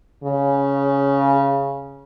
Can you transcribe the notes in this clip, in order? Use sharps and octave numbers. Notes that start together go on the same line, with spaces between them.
C#3